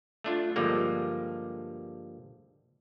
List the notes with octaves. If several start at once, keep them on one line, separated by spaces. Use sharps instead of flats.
A3 D4 F4
G2 D3 F3 G3 G#3 A#3